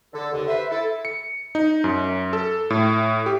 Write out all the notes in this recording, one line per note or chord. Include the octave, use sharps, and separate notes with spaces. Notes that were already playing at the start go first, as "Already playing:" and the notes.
D3 A4
D#2 D3
B4 C5 E5
E4 A4
C#7
D#4
F#2
A4
A2
G4